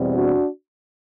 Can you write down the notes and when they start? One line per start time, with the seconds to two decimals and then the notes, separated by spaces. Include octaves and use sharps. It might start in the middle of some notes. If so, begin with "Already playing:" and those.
Already playing: E2 B2 G3 C4
0.15 D4 F#4